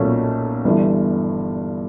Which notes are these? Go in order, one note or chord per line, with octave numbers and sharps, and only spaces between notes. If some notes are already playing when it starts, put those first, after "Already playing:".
Already playing: B1 A#2 F#3 A3 C#4
G1 G2 E3